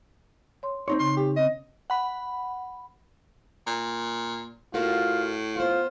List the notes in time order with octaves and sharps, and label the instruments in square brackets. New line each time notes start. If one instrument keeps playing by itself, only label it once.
[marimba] C#5 C6
[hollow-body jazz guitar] C4 D#4 C#5 [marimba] C6
[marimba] C#3 [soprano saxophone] C6
[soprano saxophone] G4
[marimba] C4 C#4 [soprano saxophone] D#5
[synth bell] F#5 B5
[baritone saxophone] A#2
[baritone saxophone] A2 [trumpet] F4 [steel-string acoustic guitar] F#4 A#4 F5
[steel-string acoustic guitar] B3 C5 [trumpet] F4